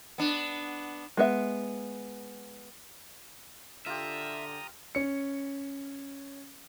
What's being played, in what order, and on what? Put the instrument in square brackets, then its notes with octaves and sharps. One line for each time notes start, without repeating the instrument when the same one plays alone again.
[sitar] B3 D4
[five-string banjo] G#3 B3 E5
[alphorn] D3 [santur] F4 G4 [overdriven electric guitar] E5 [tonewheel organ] A#5 D#6
[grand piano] C#4 C#7